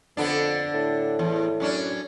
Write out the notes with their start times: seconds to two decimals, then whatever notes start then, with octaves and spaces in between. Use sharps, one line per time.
0.17 F2 D3 B3 D4
0.74 A2
1.19 E2
1.60 F#2 C#4 D4